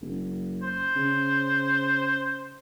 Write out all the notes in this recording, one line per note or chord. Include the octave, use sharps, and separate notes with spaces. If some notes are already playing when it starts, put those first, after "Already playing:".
F#1
C5
C#3